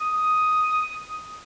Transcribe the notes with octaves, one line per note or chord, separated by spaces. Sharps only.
D#6